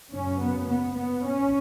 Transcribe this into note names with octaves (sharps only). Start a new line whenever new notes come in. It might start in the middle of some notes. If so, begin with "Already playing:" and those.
F#2 C#3 C#4
B3
B3
B3
C#4